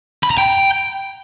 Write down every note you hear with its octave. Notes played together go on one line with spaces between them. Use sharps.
B5
A#5
G5